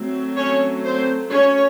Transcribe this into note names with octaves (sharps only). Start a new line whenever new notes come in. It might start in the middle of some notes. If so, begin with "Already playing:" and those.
Already playing: F#3 A3 C4
C#4 C#5
C4 C5
C#4 C#5